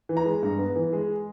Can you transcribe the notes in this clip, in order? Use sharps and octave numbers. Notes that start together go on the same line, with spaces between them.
E3
A#5
G#3
G2
B3
E3
G#3